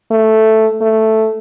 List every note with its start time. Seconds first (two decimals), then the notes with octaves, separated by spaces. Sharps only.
0.11 A3
0.81 A3